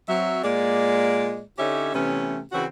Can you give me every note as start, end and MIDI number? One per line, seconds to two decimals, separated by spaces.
0.08 0.42 54
0.08 0.42 60
0.08 0.42 76
0.44 1.41 46
0.44 1.41 56
0.44 1.41 58
0.44 1.41 74
1.58 1.91 50
1.58 1.91 61
1.58 1.91 63
1.58 1.91 67
1.58 1.91 73
1.58 1.91 76
1.94 2.41 48
1.94 2.41 52
1.94 2.41 57
1.94 2.41 59
1.94 2.41 61
2.52 2.65 49
2.52 2.65 52
2.52 2.65 60
2.52 2.65 61
2.52 2.65 66